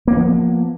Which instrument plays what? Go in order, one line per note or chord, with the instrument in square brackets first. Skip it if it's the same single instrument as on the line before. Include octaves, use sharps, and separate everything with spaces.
[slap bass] A#3
B3
F3